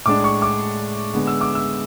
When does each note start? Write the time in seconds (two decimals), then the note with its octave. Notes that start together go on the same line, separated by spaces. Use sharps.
0.06 A2 G#3 D4 D6
0.24 C#6
0.42 D6
1.14 D3 G#3 B3
1.27 E6
1.41 D6
1.55 E6